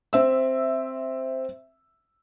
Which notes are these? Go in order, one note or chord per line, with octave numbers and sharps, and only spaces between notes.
C4 E5 E6